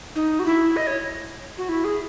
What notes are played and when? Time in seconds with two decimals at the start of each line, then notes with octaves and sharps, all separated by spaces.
0.16 D#4
0.39 F#4
0.46 E4
0.76 D#5
0.87 C#5
1.58 F#4
1.69 E4
1.84 G#4